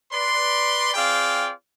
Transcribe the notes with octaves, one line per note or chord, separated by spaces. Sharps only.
B4 D5 C6
C4 F4 G#4 D5 F5 G5